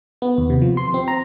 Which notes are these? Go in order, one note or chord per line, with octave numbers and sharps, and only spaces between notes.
B3
D#2
C3
F3
C6
C4
A#5